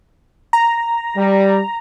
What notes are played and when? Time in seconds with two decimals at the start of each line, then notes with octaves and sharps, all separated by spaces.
0.53 A#5
1.17 G3